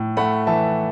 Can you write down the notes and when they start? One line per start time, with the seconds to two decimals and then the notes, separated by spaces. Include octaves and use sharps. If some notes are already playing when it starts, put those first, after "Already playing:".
Already playing: A2
0.17 A3 F#5 B5
0.47 E3 E5 A5